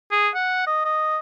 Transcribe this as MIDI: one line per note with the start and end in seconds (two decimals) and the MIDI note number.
0.12 0.29 68
0.35 0.66 78
0.67 0.82 75
0.85 1.18 75